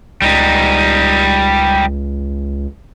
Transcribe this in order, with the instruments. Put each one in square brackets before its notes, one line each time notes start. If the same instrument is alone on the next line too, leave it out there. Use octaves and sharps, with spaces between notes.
[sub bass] C#2 [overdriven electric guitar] G3 D#4